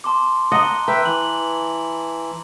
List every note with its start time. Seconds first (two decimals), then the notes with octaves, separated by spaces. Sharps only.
0.04 A5 C6 D6
0.52 D#5 F#5 A5 A#5 G7
0.88 B4 E5 G5 A#5 B5
1.05 E3 F#7